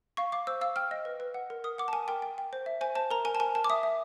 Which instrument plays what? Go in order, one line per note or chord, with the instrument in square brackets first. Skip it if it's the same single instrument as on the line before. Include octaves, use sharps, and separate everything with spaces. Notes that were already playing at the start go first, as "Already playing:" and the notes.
[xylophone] F5 C#6
F5 D6
C5 E6
F5 E6
G5 F6
D#5
B4
B4
F#5
A#4
A#4 D#6
F#5 D6
A5
A#4 G#5
A#4 G5
G5
G5
C5
E5
C5 G#5
C5 A5
A#4 A#5
A#4 G#5
A5
A#4 G#5
A#4 A5
D6
E5 D#6
E5